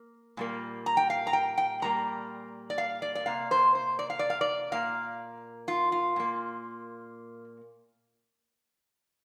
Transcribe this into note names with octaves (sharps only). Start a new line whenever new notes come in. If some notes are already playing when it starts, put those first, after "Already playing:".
Already playing: A#3
A#2 G3 A#3
A#5
G5
F5
A#5
G5
G5
A#2 G3 A#3 A#5
D5
F5
D5
D5
C3 A#3 F5
C5
C5
D5
F5
D5
F5
D5
A#2 A#3 F5
F4
F4
A#2 A#3